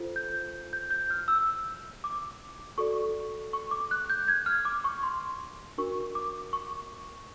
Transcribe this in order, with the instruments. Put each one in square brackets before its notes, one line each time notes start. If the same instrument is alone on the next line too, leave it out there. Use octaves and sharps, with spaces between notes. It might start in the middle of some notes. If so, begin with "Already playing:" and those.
Already playing: [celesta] F4 A4 C5
G6
G6
G6
F6
E6
D6
F#4 A4 D5 C#6
C#6
D6
F#6
G6
G#6
F6
D6
C#6
C6
D4 F#4 A#4 C#6
D6
C#6